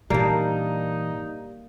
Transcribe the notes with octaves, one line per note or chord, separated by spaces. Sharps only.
A#2 E3 G3 A#3 D4 D#4